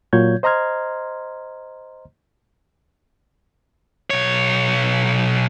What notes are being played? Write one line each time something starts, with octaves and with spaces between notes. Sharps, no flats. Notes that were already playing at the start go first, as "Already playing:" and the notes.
A#2 F#3 F4 C#5 G6 G#6
C5 D#5 A#5 C6 F6 G#6
B1 C#5